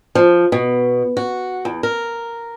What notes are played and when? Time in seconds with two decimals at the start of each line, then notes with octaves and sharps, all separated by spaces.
0.15 F3
0.52 B2
1.17 F#4
1.65 E2
1.83 A#4